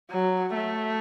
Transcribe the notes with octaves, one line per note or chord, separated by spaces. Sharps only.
F#3
A3